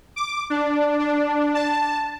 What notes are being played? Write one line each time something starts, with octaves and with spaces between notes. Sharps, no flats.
D6
D4
D4
A5